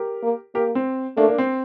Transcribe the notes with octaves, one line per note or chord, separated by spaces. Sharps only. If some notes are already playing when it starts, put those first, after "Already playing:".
Already playing: G4 A#4
A#3
A#3 G4 A#4
C4
A3 A#3 D4
A#3 D4
C4